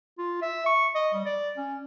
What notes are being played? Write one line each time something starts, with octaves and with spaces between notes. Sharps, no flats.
F4
E5
C#6
D#5
G3
D5
C#4